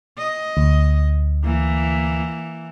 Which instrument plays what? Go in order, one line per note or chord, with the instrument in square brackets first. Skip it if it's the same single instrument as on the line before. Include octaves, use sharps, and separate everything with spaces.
[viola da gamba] D#5
[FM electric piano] D2
[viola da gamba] E3 A#3